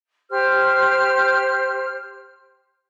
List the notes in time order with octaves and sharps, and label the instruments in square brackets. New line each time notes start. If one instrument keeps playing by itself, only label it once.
[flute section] G4 C5 F6